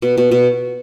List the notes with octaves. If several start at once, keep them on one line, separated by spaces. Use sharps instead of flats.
B2
B2
B2